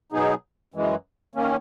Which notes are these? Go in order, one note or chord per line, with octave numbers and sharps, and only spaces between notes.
B2 F#3 B3 D#4 G#4
F#2 E3 G#3
D#3 A#3 C#4